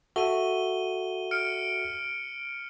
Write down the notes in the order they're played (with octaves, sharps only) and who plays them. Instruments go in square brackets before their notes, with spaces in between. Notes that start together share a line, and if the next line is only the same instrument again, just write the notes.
[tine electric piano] F#4 A4 E5 [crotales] D#7 G7
[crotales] F6 C#7 D7